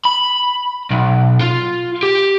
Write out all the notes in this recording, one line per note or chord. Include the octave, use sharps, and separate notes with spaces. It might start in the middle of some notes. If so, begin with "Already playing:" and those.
B5
B1
F4
G4